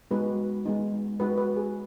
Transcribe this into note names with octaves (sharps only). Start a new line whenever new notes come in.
G#3 B3 D#4 F#4 B4
G#3 B3 D#4
G#3 D#4 F#4 B4
B4
G#4